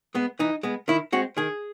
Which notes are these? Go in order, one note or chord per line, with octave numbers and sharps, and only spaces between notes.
G#3 B3
E3 D#4
G#3 B3
D#3 E4
G#3 C4 F#4
D#3 G#4